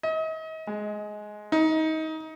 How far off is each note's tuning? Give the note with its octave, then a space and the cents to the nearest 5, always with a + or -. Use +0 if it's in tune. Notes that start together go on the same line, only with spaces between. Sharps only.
D#5 +40
G#3 +15
D#4 +25